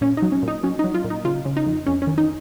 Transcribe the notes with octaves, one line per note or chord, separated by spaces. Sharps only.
A#2 C#4
D#4
F#3
C#4
A#2 D#4
F#3 C#4
D#4
F#3
F4
A#2
D#4
C#3 F4
C#3
D#4
F2
F2 C#4
C#4
D#3
D#4